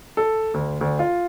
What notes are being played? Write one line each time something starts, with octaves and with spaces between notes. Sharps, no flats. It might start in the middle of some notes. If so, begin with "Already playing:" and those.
A4
D2
D2
F4